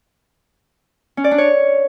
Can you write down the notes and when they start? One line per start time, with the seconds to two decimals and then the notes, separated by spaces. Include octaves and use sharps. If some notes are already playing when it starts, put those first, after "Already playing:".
1.17 C#4
1.24 D5
1.31 D4
1.38 C#5